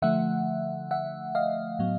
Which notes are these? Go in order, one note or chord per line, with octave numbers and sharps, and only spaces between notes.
D3 F3 A3 E5 F#5
E5 F#5
D#5 F5
A2 F#3 B3